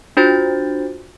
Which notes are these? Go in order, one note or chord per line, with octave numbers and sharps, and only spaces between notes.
D4 F4 F#4 C5 G6 A6